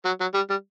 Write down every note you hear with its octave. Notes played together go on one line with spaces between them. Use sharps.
F#3
F#3
G3
G3